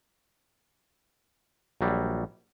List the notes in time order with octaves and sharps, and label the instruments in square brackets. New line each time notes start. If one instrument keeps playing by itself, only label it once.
[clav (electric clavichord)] A#1 F#3 G3